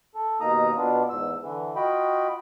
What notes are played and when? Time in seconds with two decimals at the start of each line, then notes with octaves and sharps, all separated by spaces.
0.15 A4
0.40 D#2 B2 A#3 D#4 A#5 D#6
0.76 B2 B3 D4 F4
1.10 E2 G#2 E6
1.42 D3 E3
1.76 F4 F#4 D#5 G5 B5